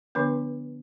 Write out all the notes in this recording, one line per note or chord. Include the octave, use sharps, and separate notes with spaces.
D3 F3 B3 D4 B4